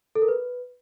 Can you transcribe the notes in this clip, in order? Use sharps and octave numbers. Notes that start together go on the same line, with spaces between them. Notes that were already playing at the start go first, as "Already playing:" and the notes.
A4
A#4
B4